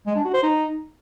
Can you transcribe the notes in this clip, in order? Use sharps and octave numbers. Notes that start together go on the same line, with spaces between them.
G#3
D4
F#4
C5
D#4